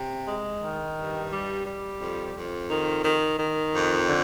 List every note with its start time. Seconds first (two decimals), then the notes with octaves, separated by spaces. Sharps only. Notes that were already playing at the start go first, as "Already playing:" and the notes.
Already playing: C3
0.27 G#3
0.63 D#3
0.97 G2
1.31 G3
1.66 G3
2.00 F2
2.35 F2
2.69 D#3
3.04 D#3
3.38 D#3
3.74 F2
4.08 D3